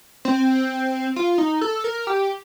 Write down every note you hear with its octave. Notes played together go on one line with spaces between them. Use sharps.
C4
F4
D#4
A4
A#4
G4